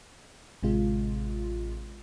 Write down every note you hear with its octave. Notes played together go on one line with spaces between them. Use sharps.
A1 C3 G#3 F4